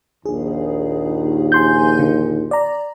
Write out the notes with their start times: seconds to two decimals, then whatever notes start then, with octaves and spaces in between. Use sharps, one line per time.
0.26 A#1 D#2 G#4
1.52 G#5 C6 G6
1.99 D3
2.51 D5 A#5